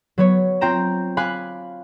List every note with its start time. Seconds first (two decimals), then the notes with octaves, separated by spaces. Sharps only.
0.18 F#3 B3 C#5
0.61 C4 F4 G5 A#5 E7
1.17 F5 G#5 B5 D6 F#6